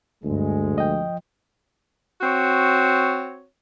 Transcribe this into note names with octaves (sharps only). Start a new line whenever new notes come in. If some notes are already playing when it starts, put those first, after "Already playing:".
D2 G2 G#3
F3 D#5 G5
C4 F#4 C#5